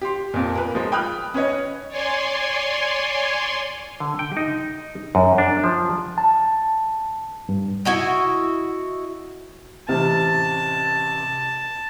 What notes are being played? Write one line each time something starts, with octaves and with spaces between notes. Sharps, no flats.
G4 C6
F2 A#2
A#4 B4
F3 G#3
G5 B5 D#6 F6 F#6
C#4 B4 C#5 D#5
C#5 D5 G#5 C6
D3
G5
D#4
F#2
D4
F3
A5
G2
E4 F#4 D#5
A1 C3 A5 F6